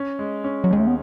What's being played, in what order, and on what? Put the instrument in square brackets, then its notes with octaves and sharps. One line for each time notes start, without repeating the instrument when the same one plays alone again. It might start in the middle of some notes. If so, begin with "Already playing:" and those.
Already playing: [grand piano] C#4
G#3
C#4
[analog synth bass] F#3
[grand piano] D#2 [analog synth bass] G#3
[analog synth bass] A3
B3